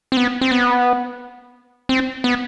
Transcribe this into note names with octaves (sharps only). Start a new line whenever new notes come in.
C4
B3
C4
B3
C4
B3